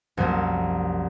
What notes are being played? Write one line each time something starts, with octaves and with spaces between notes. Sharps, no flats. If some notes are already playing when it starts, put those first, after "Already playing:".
C2 F#2 F3 A#3 A5